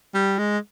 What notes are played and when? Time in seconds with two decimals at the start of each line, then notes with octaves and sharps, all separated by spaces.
0.14 G3
0.39 G#3